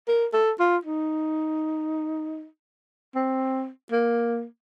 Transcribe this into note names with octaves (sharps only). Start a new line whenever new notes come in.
A#4
A4
F4
D#4
C4
A#3